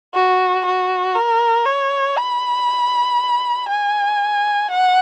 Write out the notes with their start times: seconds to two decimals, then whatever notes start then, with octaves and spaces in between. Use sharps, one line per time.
0.14 F#4
0.66 F#4
1.15 A#4
1.66 C#5
2.17 B5
3.69 G#5
4.71 F#5